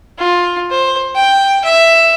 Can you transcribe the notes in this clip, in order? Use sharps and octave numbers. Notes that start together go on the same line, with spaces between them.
F4
C5
G5
E5